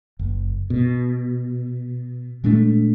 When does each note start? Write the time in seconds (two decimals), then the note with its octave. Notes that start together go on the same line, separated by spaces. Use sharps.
0.19 F#1
0.70 B2
2.44 A#2 G#3 A3 D4